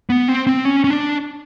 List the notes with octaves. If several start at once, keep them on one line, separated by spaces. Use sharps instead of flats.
B3
C4
C4
C#4
C#4
D4